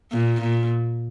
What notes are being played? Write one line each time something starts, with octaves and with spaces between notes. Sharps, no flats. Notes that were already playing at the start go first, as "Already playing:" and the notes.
A#2
A#2